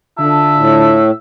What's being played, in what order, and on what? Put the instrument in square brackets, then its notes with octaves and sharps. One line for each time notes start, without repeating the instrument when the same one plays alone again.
[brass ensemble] D3 F4 A5 [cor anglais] E5
[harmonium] A2